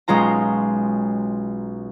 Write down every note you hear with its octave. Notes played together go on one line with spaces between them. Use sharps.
B1 G#3 C#4 F4 A#5